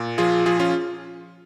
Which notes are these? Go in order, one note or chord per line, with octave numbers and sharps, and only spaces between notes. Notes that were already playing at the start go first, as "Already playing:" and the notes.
Already playing: A#2
F3 F4 G#4
F3 F4 G#4
C#4 F4